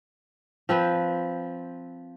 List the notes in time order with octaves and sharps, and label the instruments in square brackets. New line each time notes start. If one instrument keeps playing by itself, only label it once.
[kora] F3 C4 B4